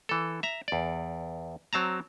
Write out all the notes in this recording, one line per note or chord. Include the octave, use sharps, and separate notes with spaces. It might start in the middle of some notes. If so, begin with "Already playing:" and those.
E3 A4
E5 A#5
E2 D5
F#3 C4 A5 A#5